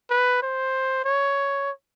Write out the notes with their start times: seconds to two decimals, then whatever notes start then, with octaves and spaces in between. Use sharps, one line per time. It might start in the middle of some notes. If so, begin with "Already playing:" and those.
0.10 B4
0.43 C5
1.05 C#5